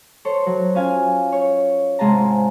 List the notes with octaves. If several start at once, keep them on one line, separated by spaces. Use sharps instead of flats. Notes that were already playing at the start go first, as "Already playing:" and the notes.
A4 C5 C#5
F#3
C#4 F4 F5 G#5
C#5
G#2 C3 G#3 F4 A5 A#5